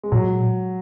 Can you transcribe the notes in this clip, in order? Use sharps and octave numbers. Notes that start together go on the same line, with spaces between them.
G#3
A#2 F#3